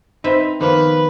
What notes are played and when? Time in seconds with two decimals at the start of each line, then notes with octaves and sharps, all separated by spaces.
0.24 C4 D#4 B4 E5
0.61 D#3 F3 A#3 B3 B4